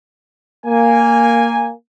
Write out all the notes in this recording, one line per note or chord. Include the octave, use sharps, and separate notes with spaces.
A#3 G#5